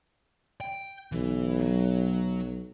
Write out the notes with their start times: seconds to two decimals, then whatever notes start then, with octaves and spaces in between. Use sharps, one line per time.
0.61 G5
1.12 B1 E3
1.61 F#3